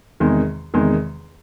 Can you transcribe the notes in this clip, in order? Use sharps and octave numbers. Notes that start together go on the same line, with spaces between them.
E2 C3 D#3 G#3
E2 C3 D#3 G#3